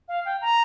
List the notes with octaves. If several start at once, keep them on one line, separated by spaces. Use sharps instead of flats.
F5
G5
A#5